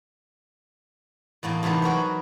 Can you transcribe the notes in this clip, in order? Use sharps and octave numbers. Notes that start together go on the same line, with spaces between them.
E2 A2 A#3 D#5
E2 C3 A3 B3 D#4
F#3 F#4 A#4 B4